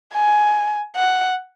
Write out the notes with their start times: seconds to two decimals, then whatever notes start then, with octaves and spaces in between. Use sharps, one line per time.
0.13 G#5
0.96 F#5